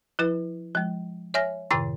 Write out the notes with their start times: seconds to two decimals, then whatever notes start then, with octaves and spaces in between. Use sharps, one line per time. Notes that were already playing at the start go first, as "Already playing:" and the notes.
0.19 F3 E4 B4
0.75 F3 G#3
1.34 C#5 E5 G#5 F6 A#6
1.71 F#2 A2 C3 D#3 C6